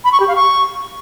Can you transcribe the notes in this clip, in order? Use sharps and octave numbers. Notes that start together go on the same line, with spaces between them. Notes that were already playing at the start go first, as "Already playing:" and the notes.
B5
C#6
G4
F5
C#6